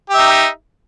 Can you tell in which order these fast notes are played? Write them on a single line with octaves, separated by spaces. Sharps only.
G4 E5 D#4